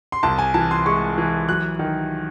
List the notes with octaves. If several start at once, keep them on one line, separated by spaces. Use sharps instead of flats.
C6
C2 A5
G#5
E3 A5
C6
G#3 C#6
E3
F#3 F#6
D#3